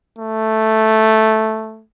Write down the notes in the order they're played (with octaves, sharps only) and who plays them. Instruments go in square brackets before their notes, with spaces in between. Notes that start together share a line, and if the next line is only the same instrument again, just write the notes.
[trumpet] A3